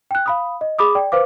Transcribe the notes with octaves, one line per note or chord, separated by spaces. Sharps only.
G5 F#6
F5 B5 D#6
D#5
G#4 B5 D6 D#6
D5 G5
B4 C5 F5 D6